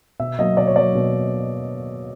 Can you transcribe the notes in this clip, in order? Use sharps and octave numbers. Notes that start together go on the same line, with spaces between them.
B2 E5
F#3 A#3 D#5
B2 D5
C#5
F#3 A#3 D5
B2